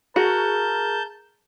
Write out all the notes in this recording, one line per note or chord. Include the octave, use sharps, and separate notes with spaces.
F#4 G#4 A#4 A5 G6